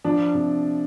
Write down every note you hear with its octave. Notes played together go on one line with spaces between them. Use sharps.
F3 D4
C3